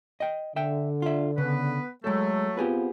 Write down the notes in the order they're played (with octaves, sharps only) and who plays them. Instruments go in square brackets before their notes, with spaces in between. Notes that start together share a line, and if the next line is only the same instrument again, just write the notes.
[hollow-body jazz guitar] D#5 G5
[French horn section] D3 [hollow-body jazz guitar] E5 G5
[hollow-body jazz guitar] F4 E5
[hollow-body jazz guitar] C#3 [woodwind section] B3 B4
[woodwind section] F#3 A3 [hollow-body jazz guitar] G#3 A4
[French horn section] B3 C4 F4 [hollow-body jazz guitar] G4 G#4 B4